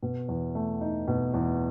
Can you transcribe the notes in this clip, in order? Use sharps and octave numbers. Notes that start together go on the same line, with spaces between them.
B2
E2
A3
D#4
B2
E2